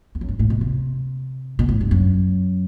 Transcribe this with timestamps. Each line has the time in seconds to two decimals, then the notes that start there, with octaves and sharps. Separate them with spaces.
0.15 E2
0.21 F#2
0.29 G2
0.39 A2
0.50 B2
0.61 C3
1.59 B2
1.69 A2
1.81 G2
1.91 F#2